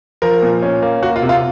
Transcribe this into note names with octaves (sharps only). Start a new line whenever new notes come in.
F3 A#4
A#2
C#4
A#3
A#3 F#4
F4
C3
F4